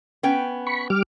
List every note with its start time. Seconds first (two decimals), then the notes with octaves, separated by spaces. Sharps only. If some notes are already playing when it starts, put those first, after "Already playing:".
0.23 B3 C#4 G5
0.67 B5 C#6
0.90 G3 D6 F6